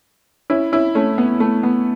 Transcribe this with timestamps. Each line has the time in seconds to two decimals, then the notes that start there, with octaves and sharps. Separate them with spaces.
0.50 C#4 E4
0.72 C#4 E4
0.95 A3 C#4
1.18 B3
1.40 A3
1.63 B3